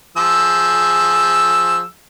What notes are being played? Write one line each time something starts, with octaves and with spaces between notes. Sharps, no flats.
F3 G#4 E6